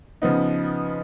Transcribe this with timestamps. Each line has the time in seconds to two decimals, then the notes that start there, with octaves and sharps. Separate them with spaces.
0.22 C#3 F3 B3 D#4